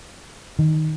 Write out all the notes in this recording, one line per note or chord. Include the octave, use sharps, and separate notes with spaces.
D#3